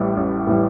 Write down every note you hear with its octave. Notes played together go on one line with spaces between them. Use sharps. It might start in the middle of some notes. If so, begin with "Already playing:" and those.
Already playing: A1 A2 E3 G3
A1
A2 E3 G3